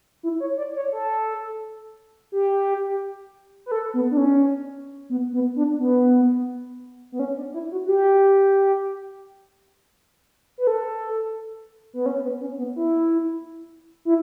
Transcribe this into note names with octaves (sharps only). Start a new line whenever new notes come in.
E4
C#5
D5
C#5
A4
G4
B4
A4
B3
D4
C#4
B3
B3
D4
B3
B3
C#4
D4
E4
F#4
F#4
G4
B4
A4
B3
C#4
B3
C#4
B3
E4
E4